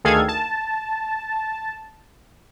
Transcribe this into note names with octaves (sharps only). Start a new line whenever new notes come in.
D2 D#3 G#4 A4 F5 G#6
A5